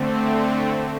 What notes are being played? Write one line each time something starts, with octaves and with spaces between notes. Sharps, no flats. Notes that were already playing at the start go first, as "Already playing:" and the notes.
Already playing: D3 A3 C4